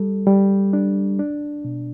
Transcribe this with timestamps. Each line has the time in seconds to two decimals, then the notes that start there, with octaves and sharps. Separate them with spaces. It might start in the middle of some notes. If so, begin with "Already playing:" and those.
Already playing: G3 A4
0.27 G3
0.73 D4
1.19 D4
1.65 B2